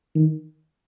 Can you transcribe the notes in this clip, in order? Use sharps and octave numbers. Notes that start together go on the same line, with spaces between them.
D#3